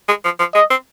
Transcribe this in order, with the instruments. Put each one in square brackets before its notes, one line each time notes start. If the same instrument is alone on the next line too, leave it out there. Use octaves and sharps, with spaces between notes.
[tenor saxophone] G#3
F3
F3
[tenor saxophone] G#3 [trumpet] D#5
[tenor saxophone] C4